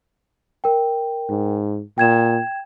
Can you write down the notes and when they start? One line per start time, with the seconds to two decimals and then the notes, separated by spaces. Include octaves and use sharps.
0.64 A#4 G5
1.29 G#2
1.98 A#2 G5 G#6 E7